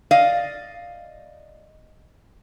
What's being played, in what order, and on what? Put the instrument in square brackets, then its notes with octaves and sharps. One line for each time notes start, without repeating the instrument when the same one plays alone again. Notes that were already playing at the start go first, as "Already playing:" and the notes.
[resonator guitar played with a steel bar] D5 D#5 F5